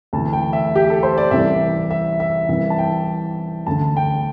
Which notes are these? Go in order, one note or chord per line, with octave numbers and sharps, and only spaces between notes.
D2 C3 E3 A5
G5
E5
G4
A4
C5
D5
C2 C3 E3 E5
E5
E5
C2 C3 E3 E5
A5
G5
D2 D3 A5
G5